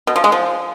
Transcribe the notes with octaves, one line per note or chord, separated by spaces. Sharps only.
B2
F3
G#3
F3